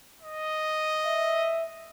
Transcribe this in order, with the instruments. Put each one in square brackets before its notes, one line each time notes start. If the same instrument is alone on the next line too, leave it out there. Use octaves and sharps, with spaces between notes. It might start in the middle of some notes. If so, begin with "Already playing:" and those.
[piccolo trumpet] D#5
[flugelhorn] E5